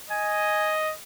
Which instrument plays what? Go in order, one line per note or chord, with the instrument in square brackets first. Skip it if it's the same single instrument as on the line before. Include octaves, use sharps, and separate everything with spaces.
[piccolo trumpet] D#5 [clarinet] G#5